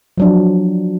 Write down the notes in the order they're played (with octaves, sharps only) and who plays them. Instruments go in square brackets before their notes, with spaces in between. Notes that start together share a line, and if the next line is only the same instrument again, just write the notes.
[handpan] F3 F#3 D4